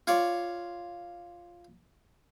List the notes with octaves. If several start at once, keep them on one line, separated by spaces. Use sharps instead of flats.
F4 C#5 D5